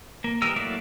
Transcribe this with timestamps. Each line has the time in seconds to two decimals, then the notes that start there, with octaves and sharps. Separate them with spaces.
0.24 A#3
0.42 E3 G3 A#4 D#5 E6
0.56 F#3 A3 A#3 E4 D5